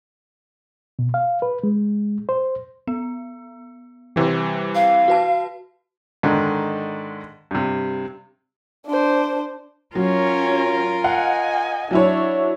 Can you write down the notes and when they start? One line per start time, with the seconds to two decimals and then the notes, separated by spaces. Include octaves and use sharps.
0.99 B2
1.14 F5
1.42 B4
1.64 G#3
2.29 C5
2.88 B3
4.16 C3 E3 G3 G4
4.75 F5
5.08 F#4 B4 A5
6.23 G#2 D3 D#3
7.51 G2 C3
8.86 D4 C5
9.95 F#3 C#4 F4 A#4 C#5
11.04 D#5 F5 F#5 G#5
11.91 F#3 D4 E4 C#5